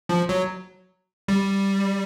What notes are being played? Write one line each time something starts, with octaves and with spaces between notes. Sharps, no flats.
F3
F#3
G3